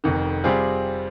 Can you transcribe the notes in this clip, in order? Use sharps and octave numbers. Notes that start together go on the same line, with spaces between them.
F1 F2 D#3
C3 G3 C4 F4 G#4